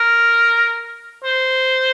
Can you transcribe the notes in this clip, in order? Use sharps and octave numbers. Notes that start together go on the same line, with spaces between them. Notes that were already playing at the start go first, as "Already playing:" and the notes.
Already playing: A#4
C5